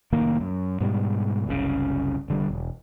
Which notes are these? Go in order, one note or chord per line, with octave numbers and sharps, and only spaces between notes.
C2 A2 D#3 A#3
F#2
G#2 B2 G3
F#1 C2 A2 C#3
F1 D3 G3
E1